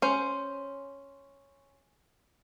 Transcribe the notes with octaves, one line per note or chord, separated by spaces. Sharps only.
C#4 C5